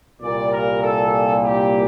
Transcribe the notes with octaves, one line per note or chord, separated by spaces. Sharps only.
C2 A#2 G3 D5
A#4
A4
G4